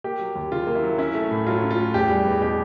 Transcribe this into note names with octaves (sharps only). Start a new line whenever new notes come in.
A#3 G4
F#3
D#2
C#3 F4
A#3
E4
F#3
C#4 E4
A3
A2
F#3 F4
C#4
F4
A3
E2 G4
G3
E2
B2 G4